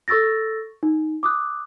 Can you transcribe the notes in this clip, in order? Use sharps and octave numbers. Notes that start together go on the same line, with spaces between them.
A4 C#6 E6 A6 A#6
D#4
D6 D#6 F#6